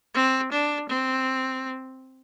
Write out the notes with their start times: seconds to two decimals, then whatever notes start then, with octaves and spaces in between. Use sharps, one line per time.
0.15 C4
0.52 D4
0.89 C4